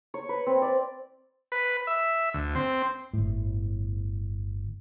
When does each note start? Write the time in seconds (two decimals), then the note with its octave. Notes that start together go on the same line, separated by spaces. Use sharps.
0.14 C#5
0.29 B4
0.46 C4
0.62 D5
1.52 B4
1.87 E5
2.34 D2
2.55 C4
3.13 G1 A2